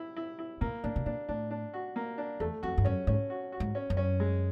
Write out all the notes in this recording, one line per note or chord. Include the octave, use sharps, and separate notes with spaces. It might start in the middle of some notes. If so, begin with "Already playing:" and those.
Already playing: E4
E4
E4
A#2 A#3
A#2 D4
B2
A#2 D4
A2 D4
D4
F#4
A#3
D4
E2 A3
F2 F#4
G2
F#2 C#4
G#2 C#4
F#4
F#4
G#2
C#4
F#2
C#4
G#3